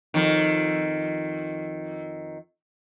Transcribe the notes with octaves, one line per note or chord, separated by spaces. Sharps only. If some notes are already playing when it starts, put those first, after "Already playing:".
F2 D#3